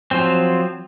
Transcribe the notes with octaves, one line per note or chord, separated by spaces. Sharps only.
F3 F#3 C4